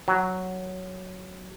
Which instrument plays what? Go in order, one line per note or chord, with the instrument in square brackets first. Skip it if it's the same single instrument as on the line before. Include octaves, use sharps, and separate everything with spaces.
[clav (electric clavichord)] F#3